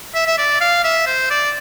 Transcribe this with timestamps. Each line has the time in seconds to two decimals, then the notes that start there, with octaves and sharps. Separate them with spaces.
0.14 E5
0.27 E5
0.38 D5
0.61 F5
0.84 E5
1.07 C5
1.30 D5